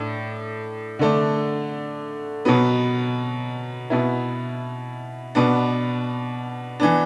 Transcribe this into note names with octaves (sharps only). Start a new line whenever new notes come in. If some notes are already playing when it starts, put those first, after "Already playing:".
Already playing: A2 D4
D3 A3 D4
B2 F#3 B3
B2 B3 E4
B2 B3 D4
E3 B3 D4